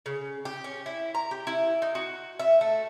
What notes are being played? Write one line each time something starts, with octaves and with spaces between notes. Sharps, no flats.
C#3
G4
C#4
E4
A#5
G4
E4
D#4
F#4
E5
A3